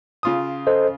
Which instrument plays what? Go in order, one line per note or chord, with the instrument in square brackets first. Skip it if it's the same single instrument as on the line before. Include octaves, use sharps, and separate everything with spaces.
[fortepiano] C#3 F4 D#6
[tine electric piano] A4 C5 D#5